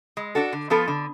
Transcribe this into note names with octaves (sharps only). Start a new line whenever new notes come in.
G#3
D4 F#4 A4
D3
F3 B3 F4 A4
D3